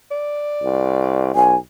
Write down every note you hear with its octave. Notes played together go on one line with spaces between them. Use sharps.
D5
C2
B1 G#5